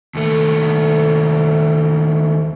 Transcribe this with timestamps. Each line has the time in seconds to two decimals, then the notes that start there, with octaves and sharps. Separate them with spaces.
0.15 D#2 A3